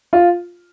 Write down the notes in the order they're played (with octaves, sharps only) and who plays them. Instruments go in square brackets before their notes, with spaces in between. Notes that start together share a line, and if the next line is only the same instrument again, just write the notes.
[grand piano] F4